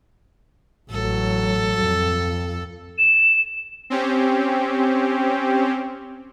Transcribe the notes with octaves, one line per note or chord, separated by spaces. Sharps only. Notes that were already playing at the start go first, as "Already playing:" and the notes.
A1 F#3 A4
F2
E7
C4 C#4 G4